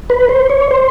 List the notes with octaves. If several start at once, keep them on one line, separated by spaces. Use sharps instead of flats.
B4
C5
C#5
C5